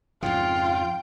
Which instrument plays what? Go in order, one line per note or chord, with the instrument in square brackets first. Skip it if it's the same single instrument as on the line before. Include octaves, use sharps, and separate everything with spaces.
[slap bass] F2 G#2 C#3 [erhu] F4 [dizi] G5